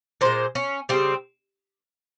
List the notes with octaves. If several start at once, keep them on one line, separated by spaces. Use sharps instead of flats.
A#2 G#3 C5
C#4
C#3 G3 C4